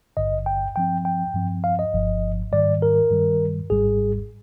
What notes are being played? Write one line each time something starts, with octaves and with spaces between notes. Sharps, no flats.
G#1 G2 D3 D#5
G5
G2 F3 C4 G5
G5
G2 F3 C4
F5
D#5
G1 G2 F3
G#2 D#3 G3 D5
A#4
G2 D#3 G3
G#1 G#2 G3 G#4